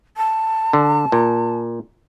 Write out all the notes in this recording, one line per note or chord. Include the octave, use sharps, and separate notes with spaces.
A5
D3
A#2